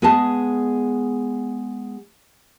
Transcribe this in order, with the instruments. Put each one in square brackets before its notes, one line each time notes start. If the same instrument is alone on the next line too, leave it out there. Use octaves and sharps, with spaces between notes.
[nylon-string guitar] G#3 B3 G#4 B4 D#5 A5